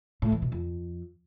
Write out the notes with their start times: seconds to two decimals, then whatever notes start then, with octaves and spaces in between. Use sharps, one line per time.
0.22 A2
0.32 E3
0.42 B2
0.52 F2